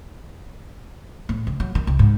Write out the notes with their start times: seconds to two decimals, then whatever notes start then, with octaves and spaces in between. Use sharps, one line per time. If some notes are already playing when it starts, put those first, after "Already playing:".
1.29 A2
1.47 C#3
1.60 F#3
1.75 D#3
1.87 C2
1.99 G#2